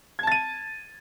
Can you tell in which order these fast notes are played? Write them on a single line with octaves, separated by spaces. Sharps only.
G#6 A5 A6 D#7